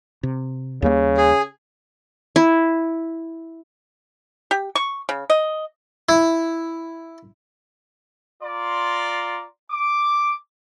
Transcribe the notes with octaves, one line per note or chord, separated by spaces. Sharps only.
C3
D#2 C#3 G3 A#3
G#4
E4
G4
C#6
C#3
D#5
E4
F4 D5 A#5 C6
D6